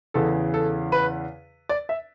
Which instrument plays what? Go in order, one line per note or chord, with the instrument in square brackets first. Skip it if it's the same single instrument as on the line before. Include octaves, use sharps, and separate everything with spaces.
[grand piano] E2 C#3 E3 A4
A4
B4
D5
E5